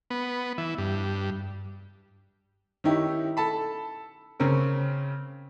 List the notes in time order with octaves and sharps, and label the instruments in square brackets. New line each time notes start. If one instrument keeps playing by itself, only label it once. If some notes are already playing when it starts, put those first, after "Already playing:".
[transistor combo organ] B3
E3
G2
[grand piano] D#3 C#4 D#4 E4 G4
A4 A5 B5
C#3 C4 C#4 A#4